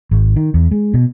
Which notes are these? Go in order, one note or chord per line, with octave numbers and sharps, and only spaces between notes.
G#1
D#3
E2
G#3
B2